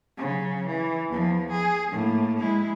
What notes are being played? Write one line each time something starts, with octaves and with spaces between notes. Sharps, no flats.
C#3 F#3
E3
E2 F3
G#4
A2 A#3
G#3 E4